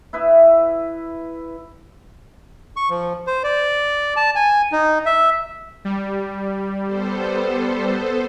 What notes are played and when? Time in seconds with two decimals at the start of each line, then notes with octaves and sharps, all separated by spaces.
0.13 E4 B4 E5
2.76 C#6
2.90 F3
3.27 C5
3.44 D5
4.16 A5
4.35 G#5
4.72 D#4
5.06 E5
5.85 G3
6.83 B3 A4 C5